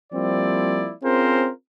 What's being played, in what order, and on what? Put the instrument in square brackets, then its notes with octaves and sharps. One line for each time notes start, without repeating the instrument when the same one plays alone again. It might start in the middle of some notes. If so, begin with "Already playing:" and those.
[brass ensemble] F3 G3 A#3 C4 E4 D5
C4 C#4 F4 G#4 A#4 C5